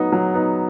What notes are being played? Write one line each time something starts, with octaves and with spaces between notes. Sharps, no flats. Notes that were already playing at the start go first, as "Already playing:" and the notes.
Already playing: F#3 B3 D#4
F#3
B3 D#4